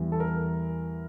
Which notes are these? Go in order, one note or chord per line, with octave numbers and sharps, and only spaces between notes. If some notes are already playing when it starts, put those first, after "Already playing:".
Already playing: E2 E3 G3
A4
A#4